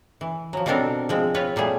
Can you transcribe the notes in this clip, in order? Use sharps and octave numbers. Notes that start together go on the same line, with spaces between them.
E3
F3 F#3
B2 G3 C4 D4 A4 A#4
F3 G#3 C4
C4 F4 B4 C#5
A#2 G3 A3 G#4